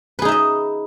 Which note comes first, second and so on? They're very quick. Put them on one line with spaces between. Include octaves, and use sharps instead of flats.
B4 G#4 D#4 E5 D#5